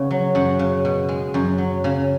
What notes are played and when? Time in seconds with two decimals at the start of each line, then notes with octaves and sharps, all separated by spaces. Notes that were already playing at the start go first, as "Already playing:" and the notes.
Already playing: C#3 B3
0.11 F#3
0.35 F#2 F#5
0.59 C#3
0.85 B2
1.09 G#3
1.34 F#2
1.58 F#3
1.84 C#3